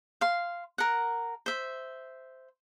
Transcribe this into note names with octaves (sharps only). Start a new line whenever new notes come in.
F5 C6
A#4 F#5
C5 E5